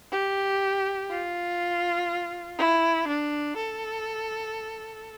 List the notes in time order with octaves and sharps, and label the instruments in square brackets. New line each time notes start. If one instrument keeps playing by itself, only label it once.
[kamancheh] G4
F4
E4
D4
A4